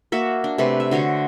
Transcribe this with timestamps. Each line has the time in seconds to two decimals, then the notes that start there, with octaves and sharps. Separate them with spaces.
0.12 A#3 F#4 E5
0.44 D4
0.58 C3 A3 B4 C5
0.80 E5
0.91 D3 F#4 C5 C#5